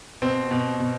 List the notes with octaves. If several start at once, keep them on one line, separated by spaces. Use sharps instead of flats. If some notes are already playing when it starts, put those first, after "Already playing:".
B2 C4
B2
B2